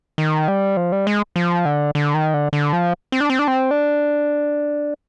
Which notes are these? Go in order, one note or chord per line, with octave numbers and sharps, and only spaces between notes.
D#3
G3
F3
G3
G#3
F3
D3
D3
D#3
D3
D3
F3
C4
D4
C4
D4
C4
D4